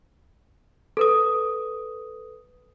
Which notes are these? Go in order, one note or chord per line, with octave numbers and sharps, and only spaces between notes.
A4 B4 D#6